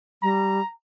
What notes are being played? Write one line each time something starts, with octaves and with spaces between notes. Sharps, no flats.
G3 A#5